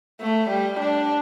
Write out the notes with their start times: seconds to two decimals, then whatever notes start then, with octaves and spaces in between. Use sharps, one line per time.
0.21 A3
0.50 G3
0.79 D4